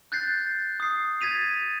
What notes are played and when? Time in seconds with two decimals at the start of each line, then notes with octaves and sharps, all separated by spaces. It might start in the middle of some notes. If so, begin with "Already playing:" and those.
0.12 F#6 G6 A6 C7
0.80 D#6 C7
1.21 G#6 A6 B6 D#7 F7